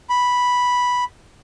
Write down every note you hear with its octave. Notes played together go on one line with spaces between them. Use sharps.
B5